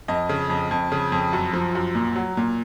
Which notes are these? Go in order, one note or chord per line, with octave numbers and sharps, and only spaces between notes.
F2 D#5
C#3
F2
F2
C#3
F2
F#2
F3
F#2
A#2
F#3
A#2